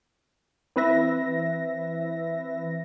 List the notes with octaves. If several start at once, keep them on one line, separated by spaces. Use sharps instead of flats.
E3 C4 B4 E5 A#6